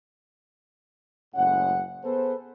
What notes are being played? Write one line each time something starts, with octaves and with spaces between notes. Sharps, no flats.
F#1 A2 C#3 G#3 C#4 F#5
B3 G#4 A4 B4 C5